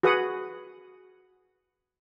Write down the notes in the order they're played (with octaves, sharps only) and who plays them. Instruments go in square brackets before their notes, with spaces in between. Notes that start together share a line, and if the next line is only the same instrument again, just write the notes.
[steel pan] F#4 G#4 B4 F#5 D#6